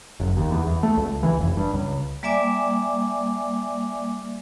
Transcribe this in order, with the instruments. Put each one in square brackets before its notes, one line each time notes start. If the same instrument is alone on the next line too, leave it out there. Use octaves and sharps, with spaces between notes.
[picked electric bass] F#1
D#2
E2
E2
A3
C#2
E3
F1
G2
C#2
[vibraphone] G3 A#3 D5 E5 G#5 D6